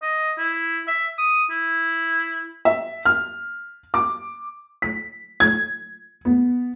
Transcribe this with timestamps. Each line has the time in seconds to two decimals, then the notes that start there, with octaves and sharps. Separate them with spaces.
0.03 D#5
0.38 E4
0.88 E5
1.19 D#6
1.51 E4
2.65 E5
3.05 F6
3.94 D6
4.82 B6
5.40 G#6
6.25 B3